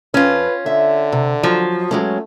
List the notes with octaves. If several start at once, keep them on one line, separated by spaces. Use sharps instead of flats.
F2 C#4 F4 B4
D3 E5
C3
F3 F#3
F#3 G#3 A3 C#4